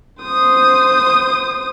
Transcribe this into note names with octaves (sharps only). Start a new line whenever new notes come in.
C5 D#6